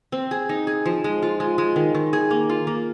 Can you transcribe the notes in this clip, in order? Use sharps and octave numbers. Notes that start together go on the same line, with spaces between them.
C4
G#4
D#4
G#4
F3
G#3
F4
G#3
G#3
D#3
D#3
G#4
A#3
F4
A#3